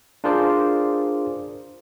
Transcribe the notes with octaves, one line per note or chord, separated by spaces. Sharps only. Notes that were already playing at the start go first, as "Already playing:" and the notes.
D4 F4 G#4 A#4 C5 D5